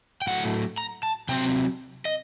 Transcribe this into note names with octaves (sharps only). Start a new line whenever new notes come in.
G5
A2 F#3 A3 F#5
A#5
A5
C3 F#3 C4 G5
D#5